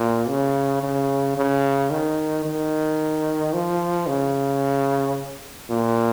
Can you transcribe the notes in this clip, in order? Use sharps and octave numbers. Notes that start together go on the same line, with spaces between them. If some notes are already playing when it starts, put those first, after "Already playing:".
Already playing: A#2
C#3
C#3
C#3
D#3
D#3
F3
C#3
A#2